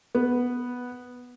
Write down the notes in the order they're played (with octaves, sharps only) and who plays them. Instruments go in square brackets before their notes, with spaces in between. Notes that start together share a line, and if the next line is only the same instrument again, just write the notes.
[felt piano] B3